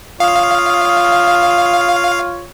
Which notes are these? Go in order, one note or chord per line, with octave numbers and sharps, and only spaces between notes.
F4 C#5 F5 D#6